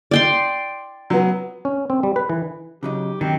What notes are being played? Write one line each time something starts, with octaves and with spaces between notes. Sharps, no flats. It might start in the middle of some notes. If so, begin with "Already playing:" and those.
D5 G5 C6
F#3 B3
C#4
C4
G3
B4
E3
C#3 F#3 D#4 G4
G2 D#3 F#3 C4